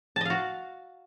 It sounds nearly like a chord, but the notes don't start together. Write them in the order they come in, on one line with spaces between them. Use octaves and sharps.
A5 D#5 F5 F#4